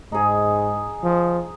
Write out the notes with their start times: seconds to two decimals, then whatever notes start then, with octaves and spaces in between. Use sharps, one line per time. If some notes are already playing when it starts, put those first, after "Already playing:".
0.12 G#2 D#4 G#4
1.03 F3